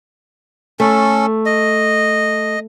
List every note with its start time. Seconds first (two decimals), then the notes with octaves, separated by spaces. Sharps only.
0.80 A3 C#4 A4
1.46 D#5